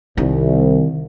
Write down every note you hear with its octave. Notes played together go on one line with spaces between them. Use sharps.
C2 D#3